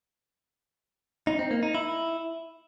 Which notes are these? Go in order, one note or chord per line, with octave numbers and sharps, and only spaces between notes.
D#4
C4
A#3
D#4
E4